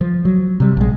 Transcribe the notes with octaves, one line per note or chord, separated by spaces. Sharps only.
F3
F#3
C3 G3
A#1 G#3